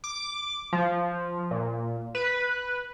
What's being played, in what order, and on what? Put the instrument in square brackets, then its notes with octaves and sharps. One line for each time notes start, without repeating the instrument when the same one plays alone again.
[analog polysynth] D6
F3
A#2
B4